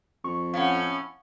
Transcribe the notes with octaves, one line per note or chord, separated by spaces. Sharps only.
F2 C#6
A2 C#4 F5 F#5